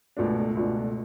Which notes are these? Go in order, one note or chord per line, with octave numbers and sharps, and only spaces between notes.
C#2 B2 A3 D4
C#2 B2 A3 D4